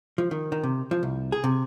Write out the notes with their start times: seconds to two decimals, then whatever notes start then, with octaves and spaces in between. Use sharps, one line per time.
0.18 F3
0.31 D#3
0.52 D#3
0.63 C3
0.91 F3
1.03 C2
1.32 G#4
1.44 C3